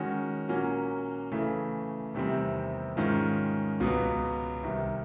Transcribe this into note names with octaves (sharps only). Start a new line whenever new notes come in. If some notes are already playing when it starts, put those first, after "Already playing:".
Already playing: D#3 G#3 C#4 F#4
A#2 F#3 A#3 C#4 F#4
C#3 E3 A3
E2 C3 D#3 G3 C4
G#2 D#3 G#3 C#4 F4
C#2 B2 F#3 B3
C2 C3 D#3